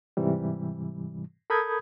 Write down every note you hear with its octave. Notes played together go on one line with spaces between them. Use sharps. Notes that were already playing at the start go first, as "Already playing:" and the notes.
G#2 C3 E3 G3
A4 A#4 B5 D#6 G6 G#6